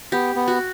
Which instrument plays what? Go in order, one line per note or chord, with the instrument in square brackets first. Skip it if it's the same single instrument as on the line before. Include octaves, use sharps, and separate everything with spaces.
[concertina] B3 [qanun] G4
[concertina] B3
[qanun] F#4